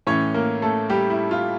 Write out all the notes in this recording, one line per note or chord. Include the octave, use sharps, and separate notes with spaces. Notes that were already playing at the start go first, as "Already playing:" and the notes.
A2 E3 C#4 C#5
A#3 A#4
A3 A4
G3 G4
E4
F4